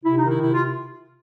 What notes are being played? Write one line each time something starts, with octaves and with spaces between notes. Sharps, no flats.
C3 E4
D#4
D#3
E4
C3 E4
F4